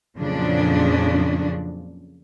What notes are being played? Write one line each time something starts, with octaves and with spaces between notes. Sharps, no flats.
F2 A#2 C#3 F3 F#3 D4